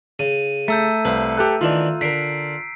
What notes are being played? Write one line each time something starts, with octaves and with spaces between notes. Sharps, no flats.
C#3 D#7
A3 A#5 E6 G6
C2 B4 C5 F5
G4 A4 F#6
D#3 E3 D4 F4
D3 A#4 B6 C7 D7